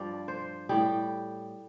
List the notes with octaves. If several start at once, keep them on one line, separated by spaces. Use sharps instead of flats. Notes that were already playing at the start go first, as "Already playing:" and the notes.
Already playing: G2 F3 D5
C5
A2 G3 G4